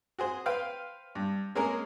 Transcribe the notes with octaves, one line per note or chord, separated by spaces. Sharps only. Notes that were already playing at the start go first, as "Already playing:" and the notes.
F#4 G#4 C5
B4 C5 F5 G5
G2
G#3 A#3 C#4 G#4 A#4